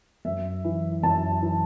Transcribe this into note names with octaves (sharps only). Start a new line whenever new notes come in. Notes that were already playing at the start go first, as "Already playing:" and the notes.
F#2 E5
E3
F#2 A5
E3